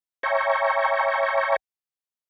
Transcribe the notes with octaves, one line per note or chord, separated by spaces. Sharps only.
C#5 E5 G5 G#5 A#5 C#6